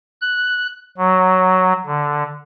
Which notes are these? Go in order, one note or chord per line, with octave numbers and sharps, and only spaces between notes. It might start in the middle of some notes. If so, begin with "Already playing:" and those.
F#6
F#3
D3